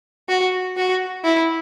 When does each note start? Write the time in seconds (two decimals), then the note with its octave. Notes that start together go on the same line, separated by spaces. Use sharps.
0.29 F#4
0.77 F#4
1.24 E4